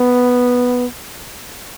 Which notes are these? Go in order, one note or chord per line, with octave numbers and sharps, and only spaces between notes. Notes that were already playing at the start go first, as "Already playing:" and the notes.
Already playing: B3